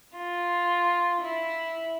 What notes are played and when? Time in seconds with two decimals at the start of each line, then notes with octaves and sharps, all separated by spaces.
0.16 F4
1.22 E4